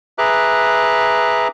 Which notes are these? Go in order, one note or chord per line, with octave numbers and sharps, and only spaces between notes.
G#4 B4 E5 A#5 D6 F#6